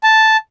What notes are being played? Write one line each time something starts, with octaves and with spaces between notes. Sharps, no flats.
A5